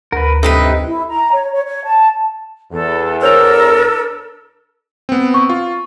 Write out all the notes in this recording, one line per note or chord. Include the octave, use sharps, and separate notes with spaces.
D2 A#4 B4
G2 C3 D#4 E4 A4 B4 D#5
E4
A#5
C#5
C#5
C#5
A5
E2 A4
D4 A4 A#4 C5 C#5 E6 F7
B3 C4
C#6
F4